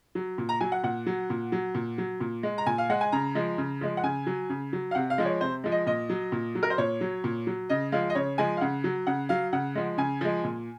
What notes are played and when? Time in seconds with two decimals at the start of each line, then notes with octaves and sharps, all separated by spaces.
0.15 F#3
0.38 A#2
0.49 A#5
0.61 F#3 G#5
0.72 F#5
0.84 A#2 F#5
1.06 F#3
1.30 A#2
1.52 F#3
1.75 A#2
1.98 F#3
2.20 A#2
2.43 G#3
2.58 A#5
2.66 A#2 G#5
2.78 F5
2.90 G#3 F#5
3.01 G#5
3.12 C#3 A#5
3.35 F3 G#3
3.58 C#3
3.81 F3 G#3
3.97 F#5
4.03 C#3 G#5
4.27 F#3
4.50 C#3
4.73 F#3
4.91 F5
4.95 C3 F#5
5.10 F5
5.18 F3 G#3
5.26 C#5
5.41 C3 C5
5.64 F3 G#3
5.72 D#5
5.87 A#2 D#5
6.10 F#3
6.32 A#2
6.55 F#3
6.63 A#4
6.70 C5
6.78 A#2 C#5
7.01 F#3
7.24 A#2
7.47 F#3
7.70 C#3 D#5
7.92 F3 G#3 F5
8.10 D#5
8.15 C#3 C#5
8.38 F3 G#3 G#5
8.57 F5
8.61 C#3 F#5
8.84 F#3
9.07 C#3 F#5
9.29 F#3 F5
9.53 C#3 F#5
9.75 F3 G#3
9.98 C#3 G#5
10.21 F3 G#3
10.44 A#2